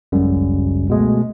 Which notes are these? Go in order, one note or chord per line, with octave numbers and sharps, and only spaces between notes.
G#1 C#2 F#2 C#3 G3
B2 G#3 A3